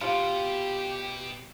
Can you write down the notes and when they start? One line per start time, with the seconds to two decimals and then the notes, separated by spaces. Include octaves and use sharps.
0.01 B2 F4 G4